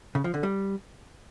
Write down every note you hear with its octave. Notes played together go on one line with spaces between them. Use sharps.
C#3
F3
D3
G3